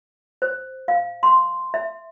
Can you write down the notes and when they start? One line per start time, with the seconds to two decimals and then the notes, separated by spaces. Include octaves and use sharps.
0.42 C5
0.88 F5
1.23 C6
1.74 E5